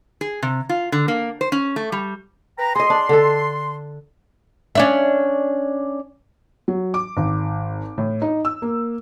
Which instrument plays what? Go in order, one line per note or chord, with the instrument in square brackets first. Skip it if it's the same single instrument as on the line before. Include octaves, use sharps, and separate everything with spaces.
[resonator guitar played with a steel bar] G#4
C3
F4
D3
A#3
C5
C#4
A3
G3
[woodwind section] B4 G5 A#5
[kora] G#4 D#5 [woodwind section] C6
[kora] D4
D3 A4
[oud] C#4 D4 E5
[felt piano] F#3
D6
G#1
A2
D#4
E6
A#3